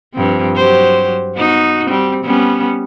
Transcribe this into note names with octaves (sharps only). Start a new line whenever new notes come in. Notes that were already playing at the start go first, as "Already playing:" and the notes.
G2 F3 C4
F#3 G4 C5
B3 D#4 F#4
G3 C4
G3 B3 C#4